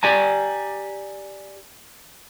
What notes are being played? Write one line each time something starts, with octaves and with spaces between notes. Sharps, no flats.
G4 D5 G#5 A#5